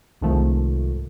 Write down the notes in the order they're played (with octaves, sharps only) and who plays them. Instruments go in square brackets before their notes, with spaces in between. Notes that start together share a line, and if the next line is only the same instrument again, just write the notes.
[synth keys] C2 G#2 D#3 F3 A3